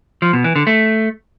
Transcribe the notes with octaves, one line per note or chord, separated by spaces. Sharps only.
F3
B2
E3
D3
A3